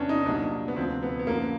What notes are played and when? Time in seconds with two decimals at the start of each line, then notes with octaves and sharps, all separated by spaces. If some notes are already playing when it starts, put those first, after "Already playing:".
Already playing: E2 C3 E3 C#4 D4
0.09 D#4
0.26 C2 A#2 F#3 D4
0.68 B3
0.76 D2 C3 F3 C4
1.03 B3
1.19 B3
1.27 F#2 D3 F3 A#3